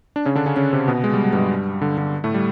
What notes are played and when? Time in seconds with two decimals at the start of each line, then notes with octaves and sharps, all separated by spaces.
0.16 D4
0.25 C#3 C#4
0.35 D3 D4
0.46 C#3 C#4
0.56 C#3 C#4
0.73 C3 C4
0.88 B2 B3
1.04 G#3
1.13 G3
1.23 F#3
1.33 G2 G3
1.81 D3
1.98 D3
2.24 A2 A3
2.34 G3